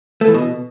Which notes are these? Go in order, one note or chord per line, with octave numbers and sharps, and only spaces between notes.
A3
E3
B2